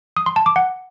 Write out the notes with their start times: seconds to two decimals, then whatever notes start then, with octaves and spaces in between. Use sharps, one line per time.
0.17 D#6
0.26 C6
0.36 A5
0.46 D6
0.56 F#5